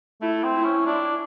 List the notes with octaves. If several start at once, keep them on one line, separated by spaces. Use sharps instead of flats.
A3 E4
C4
E4
C#4
D4 E4